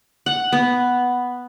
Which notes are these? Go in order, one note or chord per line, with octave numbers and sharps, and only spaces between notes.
F#5
B3